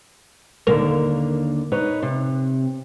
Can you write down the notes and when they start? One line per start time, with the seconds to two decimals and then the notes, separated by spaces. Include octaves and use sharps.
0.67 D#2 D3 A#3 A#4
1.72 D#4 B4 C#5
2.02 C3